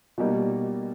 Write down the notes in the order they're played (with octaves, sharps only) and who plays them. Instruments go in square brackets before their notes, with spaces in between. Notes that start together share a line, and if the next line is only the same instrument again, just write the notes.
[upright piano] B2 G3 A#3 D#4